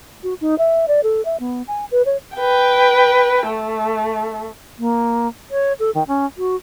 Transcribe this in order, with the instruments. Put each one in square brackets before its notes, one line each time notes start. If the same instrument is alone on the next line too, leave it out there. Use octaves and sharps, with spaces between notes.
[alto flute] F#4
D#4
E5
D5
A4
E5
B3
G#5
B4
C#5
[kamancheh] B4 G5
A3
[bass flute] A#3
C#5
A4
D#3
C#4
F#4